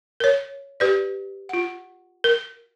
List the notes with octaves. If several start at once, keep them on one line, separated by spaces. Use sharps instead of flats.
A#4 C#5
G4 B4 D5
F4 F#5
A#4